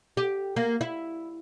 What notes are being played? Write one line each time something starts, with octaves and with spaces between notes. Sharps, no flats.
G4
A#3
E4